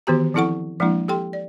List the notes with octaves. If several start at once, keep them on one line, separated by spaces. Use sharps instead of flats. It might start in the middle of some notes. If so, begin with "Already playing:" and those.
D#3 E3 B3 F#4 G4 A#5
F3 C4 E4 A4 F#5 C#6
F3 G#3 A#3 D4 E4
G4 A4 G5 C6
D5